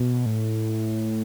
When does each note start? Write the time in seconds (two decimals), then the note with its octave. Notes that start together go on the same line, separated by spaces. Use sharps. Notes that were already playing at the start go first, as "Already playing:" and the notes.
Already playing: B2
0.26 A2